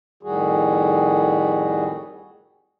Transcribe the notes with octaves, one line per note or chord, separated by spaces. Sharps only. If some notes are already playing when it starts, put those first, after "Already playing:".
F2 A2 D#3 G3 F#4 G#4